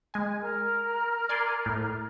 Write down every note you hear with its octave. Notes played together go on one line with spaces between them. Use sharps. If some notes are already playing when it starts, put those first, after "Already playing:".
G#3 G#5
A#4 A#5 F6
D5 G#5 C6
A2